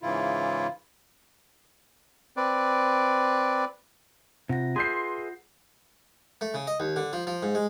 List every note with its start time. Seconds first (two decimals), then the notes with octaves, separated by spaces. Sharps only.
0.03 G#2 C#3 E3 E4 F4
2.37 C4 B4 D5
4.49 C3 F4 F#5 A#6
4.76 G#4 B4 E5 C6 G6 C7
6.41 A3
6.54 C#3
6.67 D#5
6.80 D#2
6.96 D3
7.13 F3
7.27 F3
7.42 G#2
7.55 G#3